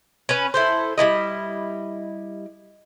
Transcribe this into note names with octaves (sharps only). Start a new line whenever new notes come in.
C#4 B4
E4 A4 C5
G3 B3 E4 D#5